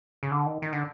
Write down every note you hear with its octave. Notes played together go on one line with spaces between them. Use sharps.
C#3
D3
D#3
D#3
D3